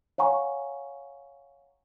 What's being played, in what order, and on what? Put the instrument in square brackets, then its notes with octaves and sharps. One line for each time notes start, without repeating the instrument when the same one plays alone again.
[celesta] C#5 F5 F#5 G#5 A#5 C#6